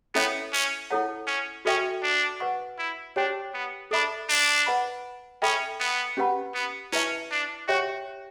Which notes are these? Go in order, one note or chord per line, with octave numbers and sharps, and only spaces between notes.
B3 C#4 E4 A4 C#5 E5
C#4
E4 A4 C#5 F#5 A5
C#4
C#4 F#4 A4 E5 G5 C#6
D4
B4 F#5 C#6
E4
D4 G4 C#5 G5
B3
D4 A4 E5 B5
D4
B4 F#5 B5
C#4 A4 E5 G5 B5
B3
C#4 G4 B4 F#5 B5
B3
C#4 E4 B4 E5 A5
D4
F#4 G4 C#5 E5 G5 C#6